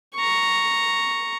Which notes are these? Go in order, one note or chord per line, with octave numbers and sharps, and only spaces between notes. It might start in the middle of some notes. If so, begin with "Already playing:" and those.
A#5 C#6